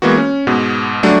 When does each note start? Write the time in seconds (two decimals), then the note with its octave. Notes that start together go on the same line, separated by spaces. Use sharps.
0.02 E3 G#3 A#3 B3 F#4
0.17 C#4
0.47 G#2 B2 B3
1.03 F#3 G3 A3 D4 F#4